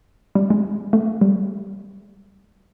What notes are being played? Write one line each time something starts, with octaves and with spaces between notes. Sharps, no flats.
G3
G#3
A3
G3